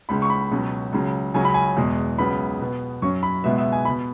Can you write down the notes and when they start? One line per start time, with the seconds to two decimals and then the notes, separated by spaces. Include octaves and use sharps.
0.09 C#2 C#3 G#3 B5
0.22 C#6
0.30 B5
0.51 C#2 B2 F#3 C#4
0.93 C#2 C#3 F#3
1.34 C#2 C#3 F#3 C#4 G#5
1.45 B5
1.54 G#5
1.76 E2 B2 G#3
2.18 C#2 C#3 F#3 B3 B5
2.60 B2 B3
3.02 F#2 F#3 C#4 C#6
3.23 B5
3.44 C#2 B2 G#3 B3 E5
3.58 E5
3.72 G#5
3.85 B2 B3 B5